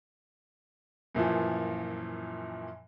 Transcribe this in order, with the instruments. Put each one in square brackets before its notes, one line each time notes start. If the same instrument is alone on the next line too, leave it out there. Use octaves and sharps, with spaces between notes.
[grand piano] F#2 A#2 E3 F3